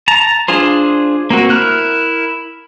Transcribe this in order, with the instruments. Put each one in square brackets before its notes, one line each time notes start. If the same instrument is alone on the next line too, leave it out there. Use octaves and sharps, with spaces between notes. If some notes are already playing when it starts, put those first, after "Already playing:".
[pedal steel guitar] A5 A#5
D4 F4 G#4 C5
A#3 C4 F#4
E4 A#4 F6 F#6